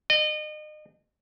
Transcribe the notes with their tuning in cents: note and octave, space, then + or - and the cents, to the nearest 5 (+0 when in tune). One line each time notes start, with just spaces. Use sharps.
D#5 -35